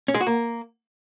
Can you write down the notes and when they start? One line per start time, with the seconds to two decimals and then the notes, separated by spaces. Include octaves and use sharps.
0.08 C#4
0.14 G#3
0.21 F#4
0.27 A#3